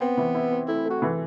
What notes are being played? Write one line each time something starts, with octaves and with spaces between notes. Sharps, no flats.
B3 C4
E3
E4
C4
A3 E4
A3 F#4
E3